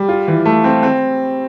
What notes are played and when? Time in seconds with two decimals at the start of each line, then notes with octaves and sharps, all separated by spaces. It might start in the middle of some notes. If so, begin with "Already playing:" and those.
Already playing: G3
0.08 F4
0.28 E3
0.45 A3
0.64 C4
0.83 C4